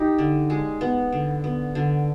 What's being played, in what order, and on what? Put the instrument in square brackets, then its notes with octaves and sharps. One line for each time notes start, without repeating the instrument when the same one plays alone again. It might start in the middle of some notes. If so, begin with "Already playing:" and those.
Already playing: [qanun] D#4 G4
D3
G#3
B3
D3
B3
D3